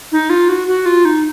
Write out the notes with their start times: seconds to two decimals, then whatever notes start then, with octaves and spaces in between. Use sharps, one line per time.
0.12 D#4
0.30 F4
0.49 F#4
0.68 F#4
0.86 F4
1.05 D#4